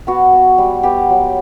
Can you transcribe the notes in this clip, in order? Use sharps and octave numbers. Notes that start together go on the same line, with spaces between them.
B3 F#4
B3
G3
B3 G4
F#3